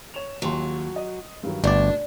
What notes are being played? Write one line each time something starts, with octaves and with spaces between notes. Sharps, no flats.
C#5 E7 F7
A#1 D#2 F#3 C6
D#5
G2 D#3 F#3
G1 B2 A3 D4 D5